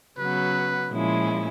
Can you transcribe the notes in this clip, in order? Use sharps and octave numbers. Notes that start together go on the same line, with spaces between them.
C#3 F#3 B3 B4
A#2 F3 G#3 C#4 E4